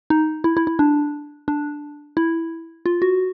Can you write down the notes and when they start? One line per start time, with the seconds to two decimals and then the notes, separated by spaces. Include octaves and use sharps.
0.10 D#4
0.44 E4
0.57 E4
0.67 E4
0.79 D4
1.48 D4
2.17 E4
2.86 F4
3.02 F#4